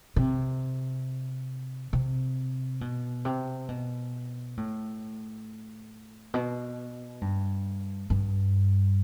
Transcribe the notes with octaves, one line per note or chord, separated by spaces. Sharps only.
C3
C3
B2
C3
B2
A2
B2
G2
G2